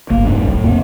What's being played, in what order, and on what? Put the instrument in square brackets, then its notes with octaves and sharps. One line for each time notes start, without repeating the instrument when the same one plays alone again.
[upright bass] G1 [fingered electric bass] A#3
[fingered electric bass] F2 G#2 [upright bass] F#3 B3
[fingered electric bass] A2 [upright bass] D#3 B3
[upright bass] F2 D3 [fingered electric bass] A#3 C4